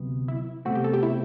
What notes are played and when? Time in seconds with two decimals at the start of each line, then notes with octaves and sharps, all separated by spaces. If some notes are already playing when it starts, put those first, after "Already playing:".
Already playing: D2 C3 F#3 B3
0.28 E4
0.65 C2 B2 A3 C4 F#4
0.75 G4
0.84 A4
0.93 G4
1.03 E4